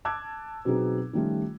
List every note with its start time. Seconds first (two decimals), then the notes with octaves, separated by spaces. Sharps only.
0.05 A5 D6 E6 F#6 G#6
0.65 B2 F#3 B3 C4 D#4 G#4
1.13 D#3 F3 G3 A3 C#4 F4